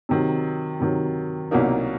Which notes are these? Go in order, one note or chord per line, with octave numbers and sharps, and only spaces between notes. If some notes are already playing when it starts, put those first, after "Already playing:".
C3 D#3 F#3
C3 D#3 F#3
C2 B2 F#3 A#3 D#4